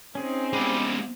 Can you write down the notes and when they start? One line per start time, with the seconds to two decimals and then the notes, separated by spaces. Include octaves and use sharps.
0.15 C4 C#4 D#4 G#4
0.53 G3 G#3 B3